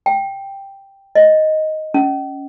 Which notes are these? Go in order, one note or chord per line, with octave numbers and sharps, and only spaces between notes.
G5
D#5
C#4